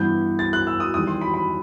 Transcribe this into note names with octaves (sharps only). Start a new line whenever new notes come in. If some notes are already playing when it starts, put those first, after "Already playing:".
Already playing: G2 E3 B3 G6
A6
F#6
E6
D#6
E2 D#3 G3 D#6
C6
B5
B5